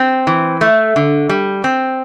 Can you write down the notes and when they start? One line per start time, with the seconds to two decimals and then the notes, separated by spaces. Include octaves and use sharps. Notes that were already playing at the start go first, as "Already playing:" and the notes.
Already playing: C4
0.27 E3
0.61 A3
0.96 D3
1.29 G3
1.64 C4